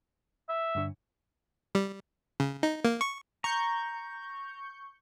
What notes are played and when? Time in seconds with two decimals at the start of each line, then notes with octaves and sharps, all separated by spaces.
0.49 E5
0.75 G2 D3 D4
1.75 G3
2.40 C#3
2.63 D#4
2.85 A#3
3.01 C#6
3.44 A#5 C#6 G6